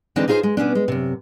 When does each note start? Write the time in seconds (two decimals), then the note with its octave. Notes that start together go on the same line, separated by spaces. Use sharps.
0.16 D3 E3 G#3 C4 D4 D#4
0.28 D#4 F4 G#4 A#4 C5
0.43 G#3
0.57 B2 B3 C#4 D4
0.75 G#3
0.88 F#2 C3